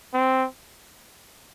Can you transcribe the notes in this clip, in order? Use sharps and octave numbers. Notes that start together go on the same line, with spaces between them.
C4